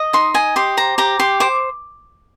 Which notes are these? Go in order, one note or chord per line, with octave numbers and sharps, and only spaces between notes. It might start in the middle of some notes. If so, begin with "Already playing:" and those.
Already playing: D#5
D#4 C6
D#5 G#5
G4 C6
C5 A#5
G4 A#5
G4 C6
C5 D6